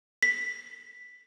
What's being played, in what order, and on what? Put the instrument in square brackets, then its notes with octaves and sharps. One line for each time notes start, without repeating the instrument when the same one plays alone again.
[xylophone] B6